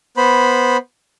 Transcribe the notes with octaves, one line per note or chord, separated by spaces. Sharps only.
B3 C5 B5